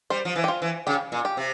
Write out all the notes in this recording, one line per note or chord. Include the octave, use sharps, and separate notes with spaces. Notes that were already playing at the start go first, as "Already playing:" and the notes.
G3 C5
F3
E3
G4
F4
E3
C#3 G4
A#2
G4
C3